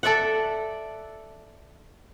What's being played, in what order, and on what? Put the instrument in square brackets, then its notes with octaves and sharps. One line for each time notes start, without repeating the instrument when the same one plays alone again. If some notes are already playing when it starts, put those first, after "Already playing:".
[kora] A4 D5 E5 F#5